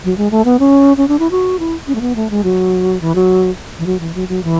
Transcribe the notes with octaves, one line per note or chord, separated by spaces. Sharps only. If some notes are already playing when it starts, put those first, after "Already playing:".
F#3
G#3
A3
B3
C#4
C#4
D4
E4
F#4
E4
C#4
A3
B3
A3
G#3
F#3
E3
F#3
E3
F#3
E3
F#3
F#3
E3